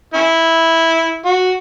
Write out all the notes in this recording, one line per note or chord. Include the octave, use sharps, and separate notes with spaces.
C#4 E4
F#4